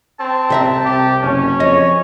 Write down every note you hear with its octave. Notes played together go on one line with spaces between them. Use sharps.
C4 A5
C2 C3 E5 A#5
G4
F#1 C#4
F2 C#5 D#5